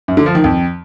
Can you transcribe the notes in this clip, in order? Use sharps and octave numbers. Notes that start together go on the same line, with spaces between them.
F#2
D3
F3
D#3
F2